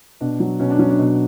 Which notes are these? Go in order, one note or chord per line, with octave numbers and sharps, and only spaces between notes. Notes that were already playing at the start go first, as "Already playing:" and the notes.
B2 D4
F#3
B2 C#4
D4
F#3 C#4
D4
B2